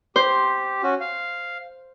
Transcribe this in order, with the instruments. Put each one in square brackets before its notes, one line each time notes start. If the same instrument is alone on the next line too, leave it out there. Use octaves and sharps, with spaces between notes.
[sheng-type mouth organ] G4 [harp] C5
[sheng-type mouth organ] C#4 F#4
F5